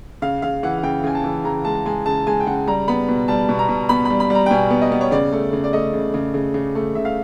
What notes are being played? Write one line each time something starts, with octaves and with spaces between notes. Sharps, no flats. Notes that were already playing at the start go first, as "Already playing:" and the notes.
C#3 F5
C#3 F5
E3 F#5
F#5
C#3 G5
C#3 G#5
A5
E3
C#3 A#5
G#3 A5
G#3 G#5
C#3 A5
G#3 G#5
G5
C#3 F#5
G3 A#5
B3 B5
B2
G3 A5
B2
A#5
B2
B3 B5
G3 B5
B5
G3
A#5
G5
B2 G#5
B3
D#5
B3
C#5
C#3 D5
A3
C#3
D5
A3 D#5
C#3
C#3
C#3
C#3
A3
C#3 E5
F5